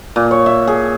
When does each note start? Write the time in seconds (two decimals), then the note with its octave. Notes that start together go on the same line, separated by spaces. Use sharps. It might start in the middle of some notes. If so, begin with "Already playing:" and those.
0.16 A#2
0.31 C#5
0.46 E5
0.67 G#4